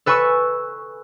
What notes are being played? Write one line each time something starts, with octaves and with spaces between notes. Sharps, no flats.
A4 B4 G#5 B5 C#6 E6